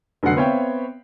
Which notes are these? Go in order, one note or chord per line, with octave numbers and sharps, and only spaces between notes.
F1 D3 F#3 F#5 C7
B3 C4 C#5 E5 F5 G5